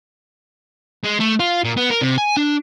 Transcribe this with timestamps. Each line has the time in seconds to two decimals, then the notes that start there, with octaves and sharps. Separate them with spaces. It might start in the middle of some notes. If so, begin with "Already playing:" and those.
1.04 G#3
1.20 A3
1.40 F4
1.64 A#2
1.77 B3
1.90 A#4
2.01 C3
2.18 G#5
2.37 D4